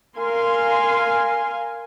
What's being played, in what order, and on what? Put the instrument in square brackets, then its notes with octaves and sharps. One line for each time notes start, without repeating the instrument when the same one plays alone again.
[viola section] A#4 F5 G#5 C6